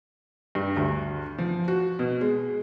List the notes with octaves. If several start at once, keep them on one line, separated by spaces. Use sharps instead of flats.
G2
D2
F3
F#4
B2
G#3